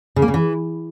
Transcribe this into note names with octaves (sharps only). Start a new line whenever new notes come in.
C#3
A#3
C#3
E3